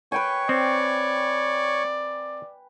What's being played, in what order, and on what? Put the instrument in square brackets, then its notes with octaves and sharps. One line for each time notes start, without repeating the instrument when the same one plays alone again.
[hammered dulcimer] B4 G5 G#5 [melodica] C#5 C#6
[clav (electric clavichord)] C4 [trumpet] D5